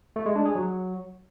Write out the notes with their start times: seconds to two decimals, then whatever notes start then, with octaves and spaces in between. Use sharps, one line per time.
0.16 A3
0.26 G#3
0.36 D4
0.45 G#4
0.55 F#3